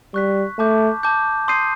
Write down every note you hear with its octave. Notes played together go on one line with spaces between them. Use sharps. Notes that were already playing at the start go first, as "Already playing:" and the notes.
G3 C#6 F#6 B6
A3 A5 D6 G6
A5 D6 G6
C6 D#6 G6 C7 D#7